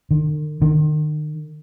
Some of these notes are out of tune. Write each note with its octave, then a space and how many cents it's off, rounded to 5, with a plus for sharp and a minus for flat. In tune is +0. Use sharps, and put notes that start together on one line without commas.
D#3 -45
D#3 -40